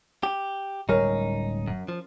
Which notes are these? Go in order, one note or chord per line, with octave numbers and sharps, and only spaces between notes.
G4
D1 G3 G#3 C#4 D#4 A#4
F#2
F3